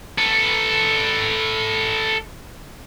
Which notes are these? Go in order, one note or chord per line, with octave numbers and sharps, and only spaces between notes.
A4 B4